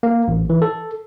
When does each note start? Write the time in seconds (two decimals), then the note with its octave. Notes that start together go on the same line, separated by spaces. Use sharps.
0.03 A#3
0.28 A1
0.50 E3
0.62 A4